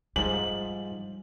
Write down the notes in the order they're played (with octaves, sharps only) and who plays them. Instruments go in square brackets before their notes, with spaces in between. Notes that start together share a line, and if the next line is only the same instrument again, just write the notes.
[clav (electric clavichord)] G#2 F3 [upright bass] G3 [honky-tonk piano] F#7